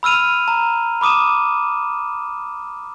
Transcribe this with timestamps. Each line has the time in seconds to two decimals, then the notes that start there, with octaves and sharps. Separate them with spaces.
0.03 B5 E6 F6 D#7 F7
0.48 A#5
1.01 B5 D6 D#6 D#7 E7